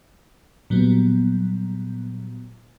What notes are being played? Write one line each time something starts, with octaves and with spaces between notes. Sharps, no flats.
A#2 F#3 G3 B3